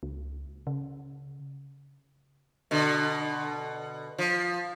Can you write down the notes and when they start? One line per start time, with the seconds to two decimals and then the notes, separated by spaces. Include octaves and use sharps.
0.03 C#2
0.67 C#3
2.71 B2 D3
4.18 F3